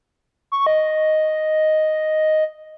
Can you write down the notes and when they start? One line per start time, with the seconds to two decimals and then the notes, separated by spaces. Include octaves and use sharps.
0.52 C#6
0.67 D#5